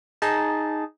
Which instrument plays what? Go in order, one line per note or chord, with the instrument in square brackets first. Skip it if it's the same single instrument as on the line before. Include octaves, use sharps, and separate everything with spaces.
[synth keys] D#4 G#4 A5